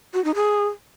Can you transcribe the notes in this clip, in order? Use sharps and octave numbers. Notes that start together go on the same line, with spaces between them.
F#4
D#4
G#4